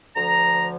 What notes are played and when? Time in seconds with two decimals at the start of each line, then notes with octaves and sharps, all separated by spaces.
0.15 D2 D3 F3 A#5